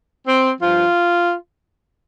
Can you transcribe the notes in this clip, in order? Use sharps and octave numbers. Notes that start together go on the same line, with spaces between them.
C4
G2 F3 F4